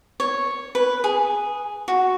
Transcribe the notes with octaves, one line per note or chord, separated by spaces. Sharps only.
C#5
B4
G#4
F#4